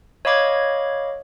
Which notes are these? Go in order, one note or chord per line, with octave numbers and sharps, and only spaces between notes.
C#5 D#5 F5 B5 D6 G#6